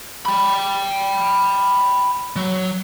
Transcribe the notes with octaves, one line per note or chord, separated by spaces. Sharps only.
G5 B5
F#3